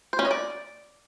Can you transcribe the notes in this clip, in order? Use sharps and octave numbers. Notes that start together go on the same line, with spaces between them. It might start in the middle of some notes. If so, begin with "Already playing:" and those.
C5
C#4
D#5
D5